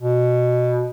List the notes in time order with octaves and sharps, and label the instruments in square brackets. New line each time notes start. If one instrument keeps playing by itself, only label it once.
[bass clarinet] B2